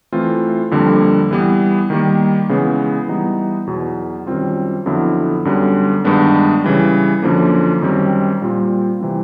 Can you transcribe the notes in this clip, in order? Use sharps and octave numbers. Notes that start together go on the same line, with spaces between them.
E3 A3 C4 F4
F2 D3 G3 A#3
E3 G3 B3
D#3 G3 A#3
C#3 E3 G#3 B3
E3 G3 B3 D#4
E2 B2 F#3
F#2 D#3 G3 C4 F4
F2 D3 F#3 B3 E4
F#2 D3 G3 B3
G2 D#3 G#3 B3 D4
C#3 E3 G3
F#2 D3 F3 A#3
F#2 D#3 G3 C4
A#2 G3 C4 F4
C3 E3 G3 C4